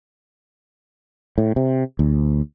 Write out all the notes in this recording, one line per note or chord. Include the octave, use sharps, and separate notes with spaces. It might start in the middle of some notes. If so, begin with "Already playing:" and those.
A2
C3
D2